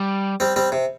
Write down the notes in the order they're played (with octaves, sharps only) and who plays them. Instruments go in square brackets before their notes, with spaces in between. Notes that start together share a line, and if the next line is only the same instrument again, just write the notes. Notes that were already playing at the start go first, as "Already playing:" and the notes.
Already playing: [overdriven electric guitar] G3
[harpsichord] G3 C4
G3 C4
C3